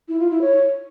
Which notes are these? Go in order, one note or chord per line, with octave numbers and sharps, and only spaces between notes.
E4
F4
E4
C#5